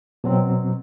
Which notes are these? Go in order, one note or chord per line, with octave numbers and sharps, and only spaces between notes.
B2 F#3 C4